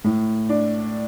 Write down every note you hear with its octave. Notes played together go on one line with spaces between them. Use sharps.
A2
D4